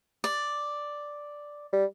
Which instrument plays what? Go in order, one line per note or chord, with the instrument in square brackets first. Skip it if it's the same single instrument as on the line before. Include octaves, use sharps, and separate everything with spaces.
[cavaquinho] D5
[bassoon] G3